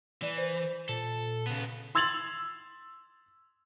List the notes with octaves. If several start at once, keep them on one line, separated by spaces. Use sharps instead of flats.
E3 D5
C5
A#2 A4
C#3 B3
C6 E6 G#6 A6 F7 F#7